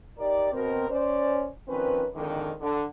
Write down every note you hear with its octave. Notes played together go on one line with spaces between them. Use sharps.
D#4 G4 A#4 D5
B2 C4 A#4
C#4 C5 D5
D#3 F3 C4 C#4 B4
F2 G#2 D3 D#3
D3